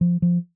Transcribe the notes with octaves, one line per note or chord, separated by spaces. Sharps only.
F3
F3